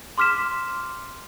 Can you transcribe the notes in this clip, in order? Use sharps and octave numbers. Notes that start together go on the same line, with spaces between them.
C6 D6 F6 B6 E7